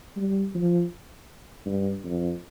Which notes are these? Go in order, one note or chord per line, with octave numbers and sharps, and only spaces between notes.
G3
F3
G2
F2